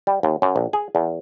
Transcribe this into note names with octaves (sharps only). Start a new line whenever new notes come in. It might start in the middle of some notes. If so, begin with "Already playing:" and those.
G3
D#2
F#2
A#1
G#4
E2